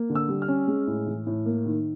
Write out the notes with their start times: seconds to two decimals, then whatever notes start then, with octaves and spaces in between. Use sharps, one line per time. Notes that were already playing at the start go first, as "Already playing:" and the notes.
Already playing: A#3
0.10 D3
0.15 E6
0.29 G3
0.42 F6
0.48 C#4
0.68 G#3
0.87 A2
1.07 E3
1.27 A2
1.46 A#3
1.66 D#3